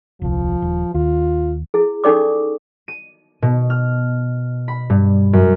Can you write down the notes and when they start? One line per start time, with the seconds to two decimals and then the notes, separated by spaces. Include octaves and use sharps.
0.22 D#1 C2 F3
0.62 D#1
0.94 D#2 F4
1.74 E4 G#4
2.04 C#4 D#4 A4 D5 C#6 D6
2.88 D#7
3.42 B2
3.70 F6
4.68 B5
4.90 G2
5.33 F#2